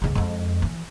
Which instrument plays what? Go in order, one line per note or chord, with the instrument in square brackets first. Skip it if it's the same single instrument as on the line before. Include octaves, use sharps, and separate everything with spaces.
[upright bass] C#2 C#3
F2 G#3
E3